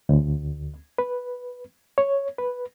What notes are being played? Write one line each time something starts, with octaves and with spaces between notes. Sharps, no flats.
D2
B4
C#5
B4